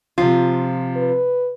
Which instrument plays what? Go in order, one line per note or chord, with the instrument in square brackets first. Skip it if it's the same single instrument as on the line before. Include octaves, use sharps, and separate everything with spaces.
[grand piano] C3 F3 [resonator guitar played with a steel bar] F4
[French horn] B4